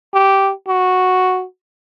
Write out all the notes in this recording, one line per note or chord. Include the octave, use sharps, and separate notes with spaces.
G4
F#4